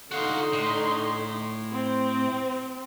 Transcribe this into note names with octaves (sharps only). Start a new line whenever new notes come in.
D3 D#4 F#4 F5 C6
A2
C4